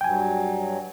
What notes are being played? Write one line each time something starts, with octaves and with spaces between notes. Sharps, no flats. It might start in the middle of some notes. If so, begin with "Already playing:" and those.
G2 F#3 G5 G#5